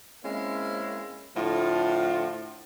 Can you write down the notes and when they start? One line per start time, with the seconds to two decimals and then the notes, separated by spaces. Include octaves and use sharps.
0.24 G#3 A#3 C4 C#4 E4
1.36 A2 D3 F3 F4